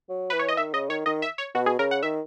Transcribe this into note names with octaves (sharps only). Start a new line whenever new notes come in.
F#3
E3 B4
C#5
D#5
D#3 E5
C#3 D#5
D#3 C#5
D#3 D#5
E5
C#5
B2 F#4
G#4
C#3 A#4
F#5
D#3 E5